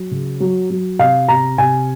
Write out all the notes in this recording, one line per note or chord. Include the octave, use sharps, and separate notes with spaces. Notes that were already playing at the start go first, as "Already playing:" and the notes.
Already playing: F#3
C#3
F#3
F#3
C3 F5
C3 A#5
C3 G#5